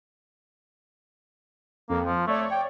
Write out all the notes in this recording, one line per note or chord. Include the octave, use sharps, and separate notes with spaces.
F2 A#3
F3
A3 C#5 D5
G5